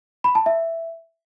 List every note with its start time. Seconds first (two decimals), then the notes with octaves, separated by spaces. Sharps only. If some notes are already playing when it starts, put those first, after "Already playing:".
0.24 B5
0.35 A5
0.46 E5